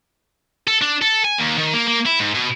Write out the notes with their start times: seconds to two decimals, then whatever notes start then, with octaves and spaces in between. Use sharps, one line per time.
0.68 A4
0.81 D4
1.02 A4
1.24 G#5
1.38 D#2
1.58 D#3
1.74 A#3
1.87 A#3
2.06 E4
2.19 G#2
2.34 B2